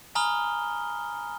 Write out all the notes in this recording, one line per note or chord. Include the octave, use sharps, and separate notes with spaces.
G#5 A#5 B5 D#6 F6 G7